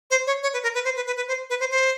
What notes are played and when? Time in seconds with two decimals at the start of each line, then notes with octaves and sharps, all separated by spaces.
0.11 C5
0.27 C#5
0.43 C#5
0.53 B4
0.63 A#4
0.75 B4
0.85 C5
0.96 B4
1.07 B4
1.17 B4
1.28 C5
1.50 B4
1.60 C5
1.71 C5